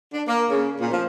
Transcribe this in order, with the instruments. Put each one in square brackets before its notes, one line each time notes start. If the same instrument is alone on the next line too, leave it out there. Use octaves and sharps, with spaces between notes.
[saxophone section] D4
A#3
C#3
A#2
F3